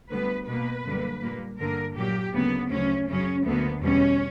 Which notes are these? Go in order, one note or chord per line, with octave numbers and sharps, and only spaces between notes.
D2 D3 G3 B3 B4
B2 A#3 B4
F#2 D3 G3 A#3
A#2 G3 A#3
G2 D3 A#3 A#4
A#2 F#3 A#3 G4
D2 C#3 F#3 A#3 B3
D2 C#3 F#3 C#4
F#2 C#3 F#3 C#4
D2 D3 A#3 B3
E2 B2 G3 C#4